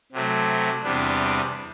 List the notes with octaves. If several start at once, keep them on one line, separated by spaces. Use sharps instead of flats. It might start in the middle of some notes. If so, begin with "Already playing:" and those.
C3 F#3 A3
E2 C3 G3 B3 D4